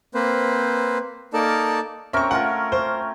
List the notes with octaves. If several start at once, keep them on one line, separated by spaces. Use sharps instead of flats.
A#3 C4 B4 C5
A#3 D#4 A4 A#4 D5 A5
C4 C#4 A#4 E5 C#6
A3 F4 A#4 F#5
C5